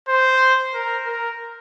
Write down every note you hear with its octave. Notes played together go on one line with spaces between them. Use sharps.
C5
A#4
A#4